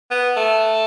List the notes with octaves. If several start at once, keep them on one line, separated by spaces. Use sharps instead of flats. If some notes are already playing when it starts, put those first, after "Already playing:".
B3
A3